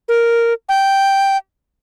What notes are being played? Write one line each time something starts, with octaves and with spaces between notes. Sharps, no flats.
A#4
G5